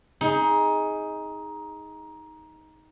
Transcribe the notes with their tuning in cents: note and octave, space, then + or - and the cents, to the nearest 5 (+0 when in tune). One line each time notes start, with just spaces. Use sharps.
D#4 +15 G#4 +0